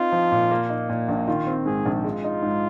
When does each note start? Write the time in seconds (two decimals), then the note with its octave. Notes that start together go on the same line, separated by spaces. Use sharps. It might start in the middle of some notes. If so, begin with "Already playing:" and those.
Already playing: C4 D#4 F4
0.12 F3
0.32 A#2
0.51 A#3
0.70 D#4
0.89 A#2
1.08 A#1
1.28 D#3 F4
1.47 C4
1.66 G#2 G#4
1.86 A#1
2.04 G#3 F4
2.24 D#4
2.42 G#2